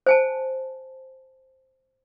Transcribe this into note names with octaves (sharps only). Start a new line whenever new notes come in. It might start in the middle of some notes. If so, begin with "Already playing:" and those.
C5 G#5 A5